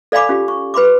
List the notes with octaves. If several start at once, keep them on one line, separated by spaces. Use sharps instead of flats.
A4 D5 F5 G#5 B5 D6
C#4 F4 G4
C#6
B4 B5 C6 D6